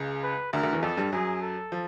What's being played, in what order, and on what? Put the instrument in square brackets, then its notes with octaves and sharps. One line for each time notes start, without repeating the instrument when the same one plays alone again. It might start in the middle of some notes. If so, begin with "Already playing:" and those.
Already playing: [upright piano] C#2 C#3
[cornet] B4
[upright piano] D2 D3 [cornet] A#4
[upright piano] D2 D3
E2 E3
[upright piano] F2 F3 [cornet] A4
[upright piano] G2 G3
[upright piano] F#2 F#3 [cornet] G#4
[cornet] A4
[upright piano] F3